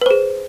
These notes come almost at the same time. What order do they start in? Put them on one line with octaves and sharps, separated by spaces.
B4 C5 G#4